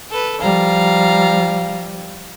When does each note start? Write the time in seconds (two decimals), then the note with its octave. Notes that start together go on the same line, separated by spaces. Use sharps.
0.10 A4 B4
0.41 F3 G3 F5 A#5